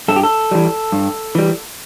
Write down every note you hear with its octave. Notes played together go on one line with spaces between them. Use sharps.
G2 A4
G4
A4
E3 G3
G2
E3 G3